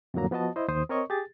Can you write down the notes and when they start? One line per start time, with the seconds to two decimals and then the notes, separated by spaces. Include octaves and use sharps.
0.14 F2 A2 D3 F#3 A#3 A#5
0.31 F3 B3 F#4 D#5 A5
0.56 E4 C5 D#5
0.68 D#2 D#3 C5 D#6
0.89 C4 A#4 C#5 D#5 C#6
1.10 G4 G#4 A6